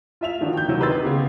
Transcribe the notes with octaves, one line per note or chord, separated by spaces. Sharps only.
F4 E5 F7
D3 D#3 F3 D4 F#4
G5 G6
D2 C3 D#3 F#3
G4 B4 D#5 C6 E6 A6
C#3 B3 G4